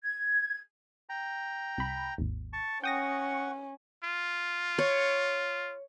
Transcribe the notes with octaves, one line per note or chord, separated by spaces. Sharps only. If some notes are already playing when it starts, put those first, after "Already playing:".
G#6
G5 A#5
C2 B5
G#1 D#2
A5 C#6
C#4 F#5 G5 C#6 D#6 A#6
F4
C#5